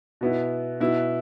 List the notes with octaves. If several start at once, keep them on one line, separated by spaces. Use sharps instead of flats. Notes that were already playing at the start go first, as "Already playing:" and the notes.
B2 B3 E4
B2 B3 E4